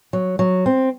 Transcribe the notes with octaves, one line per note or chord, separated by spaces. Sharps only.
F#3
F#3
C4